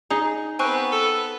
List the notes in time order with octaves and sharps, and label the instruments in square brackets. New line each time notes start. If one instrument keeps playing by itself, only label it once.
[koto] D#4 G#4 [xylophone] A#5
[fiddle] B3 B4 [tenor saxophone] C4 [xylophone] G#5 C#6 F#6
[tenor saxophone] A4